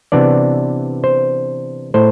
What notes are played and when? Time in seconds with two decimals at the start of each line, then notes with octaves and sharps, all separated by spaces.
0.12 C3 E3 B3 D4 D5
1.04 C5
1.94 A2 C5